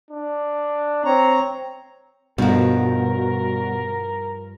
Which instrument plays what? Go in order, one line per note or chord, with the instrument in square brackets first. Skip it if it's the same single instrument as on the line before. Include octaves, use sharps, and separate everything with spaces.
[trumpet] D4
[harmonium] C4 A#5 [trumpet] C#5
[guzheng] G2 F3 [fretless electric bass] B2 [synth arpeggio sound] G3 F#4 [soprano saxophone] A#4